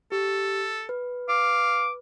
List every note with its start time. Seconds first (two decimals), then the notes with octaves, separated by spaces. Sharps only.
0.12 G4 A4
0.89 B4
1.29 F5 D6